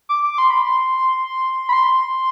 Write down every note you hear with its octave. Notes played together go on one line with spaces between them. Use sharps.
D6
D6
C6
B5
C6
B5
C6